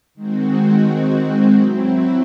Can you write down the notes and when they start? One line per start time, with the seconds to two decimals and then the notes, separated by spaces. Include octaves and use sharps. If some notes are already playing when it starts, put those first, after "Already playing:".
0.14 D#3 G#3 C4 F#4
1.55 F#3 C4 E4